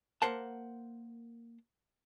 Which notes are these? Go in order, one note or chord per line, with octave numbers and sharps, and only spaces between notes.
A#3 A#4 C5 F#5 A5